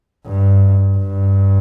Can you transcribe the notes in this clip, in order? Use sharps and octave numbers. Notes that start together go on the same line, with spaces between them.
G2
G2